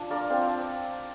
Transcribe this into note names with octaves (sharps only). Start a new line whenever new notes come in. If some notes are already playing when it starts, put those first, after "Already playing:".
Already playing: F3 D4
F4 A#4 D5
C4 C5 F5